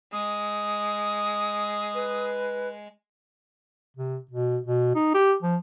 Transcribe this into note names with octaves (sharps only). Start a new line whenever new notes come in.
G#3 D#6
B4
C3
B2
B2
D#4
G4
F3